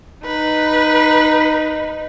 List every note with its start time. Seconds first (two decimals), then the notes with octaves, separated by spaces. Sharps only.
0.25 D#4 B4